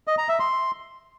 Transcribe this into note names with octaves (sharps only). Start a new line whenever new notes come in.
D#5
A#5
E5
C6